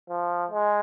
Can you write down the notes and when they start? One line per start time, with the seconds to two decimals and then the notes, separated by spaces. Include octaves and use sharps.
0.09 F3
0.51 G#3